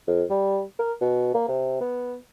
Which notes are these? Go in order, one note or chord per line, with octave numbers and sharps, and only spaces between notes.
F2
G3
A#4
B2
A#3
C3
B3